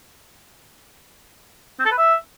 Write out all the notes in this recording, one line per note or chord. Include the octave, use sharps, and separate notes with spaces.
C4
A4
B4
E5